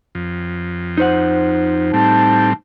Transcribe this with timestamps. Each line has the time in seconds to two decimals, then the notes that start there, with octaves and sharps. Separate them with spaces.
0.15 F2
0.97 D#4 C5 F#5
1.94 A2 G3 C4 A5